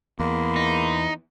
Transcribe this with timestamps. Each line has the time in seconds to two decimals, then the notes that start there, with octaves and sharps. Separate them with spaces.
0.20 E2 G#3 A#3 B5 C6
0.56 D#4